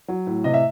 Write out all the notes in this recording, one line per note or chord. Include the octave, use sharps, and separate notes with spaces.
F#3
A2
C3 D#5
E5